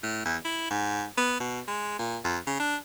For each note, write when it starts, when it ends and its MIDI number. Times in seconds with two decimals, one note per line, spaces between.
0.03 0.24 45
0.25 0.37 40
0.44 0.68 64
0.70 1.05 44
1.17 1.38 59
1.40 1.60 47
1.68 1.99 56
1.99 2.18 46
2.24 2.38 41
2.47 2.55 49
2.59 2.76 62